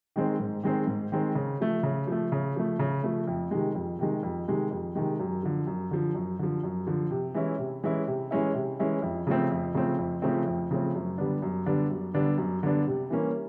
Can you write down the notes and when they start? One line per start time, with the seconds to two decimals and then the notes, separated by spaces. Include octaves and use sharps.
0.16 D#3 G#3 C4
0.39 G#2
0.63 D#3 G#3 C4
0.87 G#2
1.12 D#3 G#3 C4
1.35 C#3
1.60 F3 A3
1.83 C#3
2.07 F3 A3
2.32 C#3
2.56 F3 A3
2.79 C#3
3.04 F3 A3
3.27 F2
3.51 C3 D#3 G#3
3.75 F2
3.99 C3 D#3 G#3
4.23 F2
4.48 C3 D#3 G#3
4.71 F2
4.95 C3 D#3 G#3
5.20 F#2
5.43 D3 F3
5.67 F#2
5.91 D3 F3
6.15 F#2
6.39 D3 F3
6.64 F#2
6.87 D3 F3
7.11 C3
7.34 E3 G#3 C#4 E4
7.58 C3
7.84 E3 G#3 C#4 E4
8.07 C3
8.31 E3 G#3 C#4 E4
8.55 C3
8.79 E3 G#3 C#4 E4
9.02 F2
9.27 C#3 F3 A3 C4
9.51 F2
9.74 C#3 F3 A3 C4
9.98 F2
10.22 C#3 F3 A3 C4
10.46 F2
10.71 C#3 F3 A3 C4
10.95 F#2
11.18 D3 G3 B3 D4
11.42 F#2
11.66 D3 G3 B3 D4
11.91 F#2
12.14 D3 G3 B3 D4
12.38 F#2
12.63 D3 G3 B3 D4
12.87 C3
13.10 E3 G3 A#3 C#4